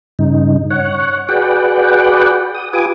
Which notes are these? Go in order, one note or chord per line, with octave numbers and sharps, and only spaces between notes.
G2 C#3 D#4
C#5 F#5
F#4 G#4 B4 D5 F#5 G5
D#6
F4 G4 B4 G#5 D6 D#6